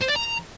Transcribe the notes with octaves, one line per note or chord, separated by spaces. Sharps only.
C5
D5
A#5